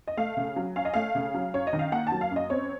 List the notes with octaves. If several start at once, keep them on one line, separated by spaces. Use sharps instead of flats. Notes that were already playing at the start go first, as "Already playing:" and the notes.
D#5
A3 F5
C#3
F#3
C#4 F5
D#5
A3 F5
C#3
F#3
F#2 C#5
D#5
D#3
F5
A#3 F#5
A5
F#3
F5
F#2
D#5
C4 C#5